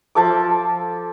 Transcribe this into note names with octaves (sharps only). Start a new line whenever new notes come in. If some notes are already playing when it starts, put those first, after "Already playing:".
F3 A4 D6